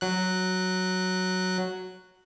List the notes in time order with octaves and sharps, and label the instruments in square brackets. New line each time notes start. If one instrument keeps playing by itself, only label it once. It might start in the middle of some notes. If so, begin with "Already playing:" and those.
[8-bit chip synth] F#3 F#6